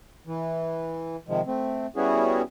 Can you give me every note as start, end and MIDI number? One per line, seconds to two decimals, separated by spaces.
0.27 1.16 52
1.28 1.41 48
1.28 1.41 51
1.28 1.41 53
1.28 1.41 56
1.46 1.86 57
1.46 1.86 60
1.96 2.42 55
1.96 2.42 59
1.96 2.42 61
1.96 2.42 64
1.96 2.42 66
1.96 2.42 68